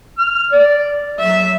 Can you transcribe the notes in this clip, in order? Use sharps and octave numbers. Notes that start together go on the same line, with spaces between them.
F6
D5
F#3 E5